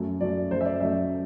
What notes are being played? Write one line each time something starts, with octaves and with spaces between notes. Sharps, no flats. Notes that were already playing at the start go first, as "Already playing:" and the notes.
Already playing: F#2 F#3 A3
F#2 F#3 A3 D5
F#2 F#3 A3 C5
E5
D5
F#2 F#3 A3 E5